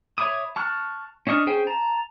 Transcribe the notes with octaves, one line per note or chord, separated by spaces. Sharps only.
C#5 E5 B5 D6 D#6
A5 C#6 F6 F#6
C#4 D4 D#5 C#6 F6
C#4 G#4 C5 G5
A5 A#5